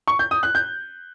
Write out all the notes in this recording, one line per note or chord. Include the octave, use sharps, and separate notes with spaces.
C#6
G6
D#6
F#6
G6